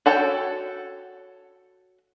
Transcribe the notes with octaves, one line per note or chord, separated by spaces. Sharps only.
F#4 A4 C#5 G5